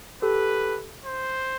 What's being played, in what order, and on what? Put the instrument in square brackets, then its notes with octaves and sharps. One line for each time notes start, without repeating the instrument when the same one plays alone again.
[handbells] G4 A4 [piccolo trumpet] B4
[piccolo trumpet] C5